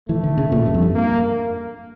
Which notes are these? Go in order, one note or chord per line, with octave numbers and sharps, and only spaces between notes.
E3 A3
D3
C#3
A#2
G2
F2
G2
A#3